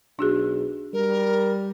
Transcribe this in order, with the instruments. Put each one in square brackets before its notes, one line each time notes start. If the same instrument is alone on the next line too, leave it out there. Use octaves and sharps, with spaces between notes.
[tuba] B1 [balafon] D4 F#4 G#4
[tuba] G3 [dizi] A#4